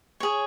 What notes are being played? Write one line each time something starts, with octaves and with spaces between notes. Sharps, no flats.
G#4 C#5